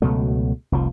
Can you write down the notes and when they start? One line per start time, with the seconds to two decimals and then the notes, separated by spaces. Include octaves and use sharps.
0.02 C#2 B2 F#3 A3
0.72 F1 C2 F3